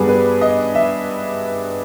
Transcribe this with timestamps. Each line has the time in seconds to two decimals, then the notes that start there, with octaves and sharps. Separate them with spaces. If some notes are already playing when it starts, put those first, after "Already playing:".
Already playing: G2 G3 B3 G#4
0.08 B4
0.41 D#5
0.75 E5